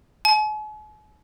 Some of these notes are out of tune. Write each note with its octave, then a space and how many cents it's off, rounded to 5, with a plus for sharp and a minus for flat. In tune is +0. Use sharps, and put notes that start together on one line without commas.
G#5 +45